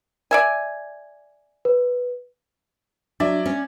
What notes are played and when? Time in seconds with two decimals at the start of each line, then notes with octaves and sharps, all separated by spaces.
0.31 D5 E5 G#5
1.65 B4
3.20 F#3 D4 D5 E5
3.46 C#4